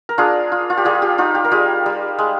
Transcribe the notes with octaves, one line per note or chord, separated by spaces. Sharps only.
A#4
D4 F4 G#4
F4
F4
G4
G3 F4 G#4
G4
D#4 F4
G4
A#4
G3 F4 G#4
G3
G#3